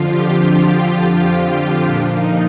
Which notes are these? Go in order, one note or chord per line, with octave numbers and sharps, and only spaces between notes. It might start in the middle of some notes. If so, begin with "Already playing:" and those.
Already playing: F2 D3 F3 F4
G4
F4
A#2 F3 D4
D#4